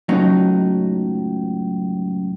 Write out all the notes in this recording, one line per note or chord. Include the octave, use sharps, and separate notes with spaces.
C#2 F#2 A2 F#3 D#4